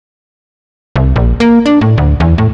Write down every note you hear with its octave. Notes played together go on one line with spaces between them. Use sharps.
C2
A#1
A#3
D4
A2
D2
E2
A2